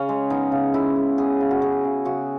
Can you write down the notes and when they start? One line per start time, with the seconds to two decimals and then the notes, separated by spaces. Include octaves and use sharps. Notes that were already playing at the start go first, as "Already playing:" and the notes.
Already playing: C#3 C#4
0.09 G#3
0.30 B3 D#4
0.52 C#3
0.74 C#3 E4
0.96 G#3
1.18 B3 G#4
1.41 C#3
1.51 F#4
1.62 C#3 G#4
1.84 C#3
2.05 C#3 F#4